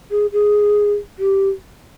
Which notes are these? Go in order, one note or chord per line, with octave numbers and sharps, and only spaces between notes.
G#4
G#4
G4